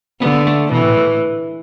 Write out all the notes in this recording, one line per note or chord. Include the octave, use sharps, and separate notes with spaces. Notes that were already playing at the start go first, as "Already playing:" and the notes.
D3 B3
A3
B2 E3
A2
A2